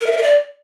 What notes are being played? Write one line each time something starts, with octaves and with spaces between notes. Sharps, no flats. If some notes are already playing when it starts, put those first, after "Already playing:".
A#4
E5
A#4
E5
D5